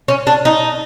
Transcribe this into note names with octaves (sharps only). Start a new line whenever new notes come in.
C#4
D4
D#4